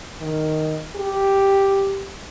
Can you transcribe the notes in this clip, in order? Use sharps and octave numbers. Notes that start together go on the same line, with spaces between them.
D#3
G4